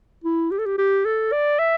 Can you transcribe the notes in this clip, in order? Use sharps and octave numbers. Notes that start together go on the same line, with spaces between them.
E4
G4
A4
G4
G4
A4
D5
E5